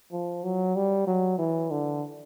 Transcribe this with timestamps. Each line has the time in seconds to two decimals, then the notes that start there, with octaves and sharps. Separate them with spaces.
0.12 F3
0.43 F#3
0.76 G3
1.07 F#3
1.38 E3
1.71 D3